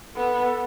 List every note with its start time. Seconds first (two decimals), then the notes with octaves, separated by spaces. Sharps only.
0.15 B3 A4